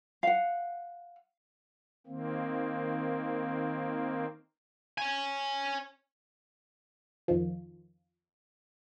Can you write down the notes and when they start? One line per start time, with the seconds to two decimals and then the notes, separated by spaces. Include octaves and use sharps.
0.23 F5 F#5
2.07 D#3 A#3 C4
4.98 C#5 G#5
7.28 F2 D#3 F3